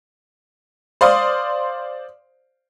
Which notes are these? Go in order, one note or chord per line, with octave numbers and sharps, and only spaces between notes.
C5 D5 F5 C6 D#6